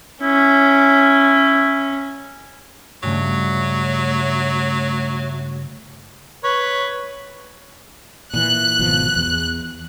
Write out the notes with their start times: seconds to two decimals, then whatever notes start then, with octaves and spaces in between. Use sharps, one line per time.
0.22 C#4 E4
3.03 G2 C#3 F#3 A3
6.44 B4 C#5
8.33 A#2 E3 F#6
8.79 G#1 B2 F3
9.16 E2